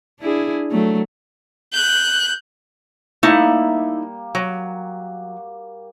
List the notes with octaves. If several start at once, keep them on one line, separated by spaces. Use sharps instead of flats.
D4 E4 G#4
F#3 A3
F#6 G6
G3 A3 A#3 D#4 E4
F#3